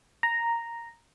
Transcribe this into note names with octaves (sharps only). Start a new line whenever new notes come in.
A#5